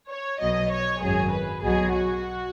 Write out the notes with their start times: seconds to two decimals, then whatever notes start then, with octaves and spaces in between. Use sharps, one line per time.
0.09 C#5
0.40 B1 B2 F#3 D#5
0.71 C#5
1.01 G#1 F#2 F#3 G#4
1.32 B4
1.62 B1 B2 F#3 G#4
1.93 F#4